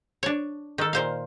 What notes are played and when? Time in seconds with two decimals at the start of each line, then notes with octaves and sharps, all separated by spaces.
0.23 D4 C#5
0.78 D#3 A4
0.93 A#2 C5 F5